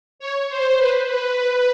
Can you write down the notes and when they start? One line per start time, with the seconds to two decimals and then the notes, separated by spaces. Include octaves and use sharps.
0.19 C#5
0.49 C5
0.78 B4
1.07 B4